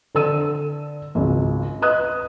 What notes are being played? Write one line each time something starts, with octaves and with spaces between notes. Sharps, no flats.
D3 A4 E6 D#7
G#1 C#2
B4 D#5 D#6 F#6